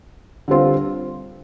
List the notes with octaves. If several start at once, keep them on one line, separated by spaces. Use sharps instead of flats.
D3 G3 C4 F4